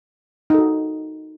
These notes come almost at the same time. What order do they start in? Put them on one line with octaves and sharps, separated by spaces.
D#4 A4 F#4